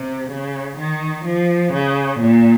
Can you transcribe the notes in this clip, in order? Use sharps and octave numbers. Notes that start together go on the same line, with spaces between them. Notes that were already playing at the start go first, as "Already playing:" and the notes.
Already playing: C3
C#3
D#3
F3
C#3
A#2